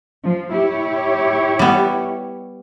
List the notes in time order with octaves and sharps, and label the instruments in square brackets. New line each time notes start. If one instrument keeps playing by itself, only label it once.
[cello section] F3
E4 G4 C#5
[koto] G3 B3